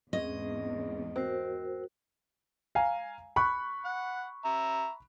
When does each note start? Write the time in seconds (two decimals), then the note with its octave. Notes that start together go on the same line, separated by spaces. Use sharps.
0.13 E2 G#2 C4 C#4 G#4 D#5
1.16 C4 F#4 A#4 C5
2.75 F5 G#5 A#5
3.36 B5 C#6 F#6
3.85 F#5
4.45 E5 A#5